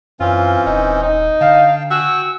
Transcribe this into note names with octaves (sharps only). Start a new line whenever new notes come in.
F#2 E3 C4 C#4 F4
D#1 D#4
D#4
D3 F5 G5 A5
F#4 G5 G#5 C#6 E6